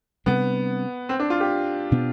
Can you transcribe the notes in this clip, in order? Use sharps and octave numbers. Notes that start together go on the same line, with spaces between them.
C3 G3 B3 D4
C4
D4
F4
G4
B2 B3 D4